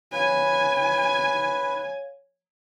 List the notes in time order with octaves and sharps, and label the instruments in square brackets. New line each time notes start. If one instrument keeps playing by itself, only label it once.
[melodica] B4 [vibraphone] C#5 F5 [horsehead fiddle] G#5